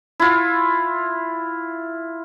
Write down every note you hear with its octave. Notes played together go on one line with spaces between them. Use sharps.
E4 F4